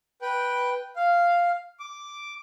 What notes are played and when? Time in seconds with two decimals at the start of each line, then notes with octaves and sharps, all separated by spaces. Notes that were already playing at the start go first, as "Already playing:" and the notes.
0.22 B4 G5
0.96 F5
1.80 D6